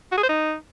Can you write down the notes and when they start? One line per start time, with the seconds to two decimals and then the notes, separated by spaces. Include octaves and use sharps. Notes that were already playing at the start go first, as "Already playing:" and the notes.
0.12 F#4
0.18 G#4
0.23 C5
0.29 D#4